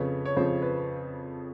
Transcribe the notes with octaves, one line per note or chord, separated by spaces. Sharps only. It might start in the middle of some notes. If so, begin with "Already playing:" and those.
Already playing: F2 C#3 F3 B4 C#5
C#5
F2 C#3 F3 C5
B4